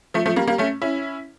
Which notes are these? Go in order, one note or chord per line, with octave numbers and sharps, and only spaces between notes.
F3 A3
F3 A3
G3 A#3
G3 A#3
A3 C#4
C#4 E4